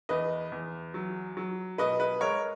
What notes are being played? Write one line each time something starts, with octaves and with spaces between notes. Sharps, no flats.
E2 B4 D#5
E2
F#3
F#3
B2 B4 D#5
B4
G#3 A#4 C#5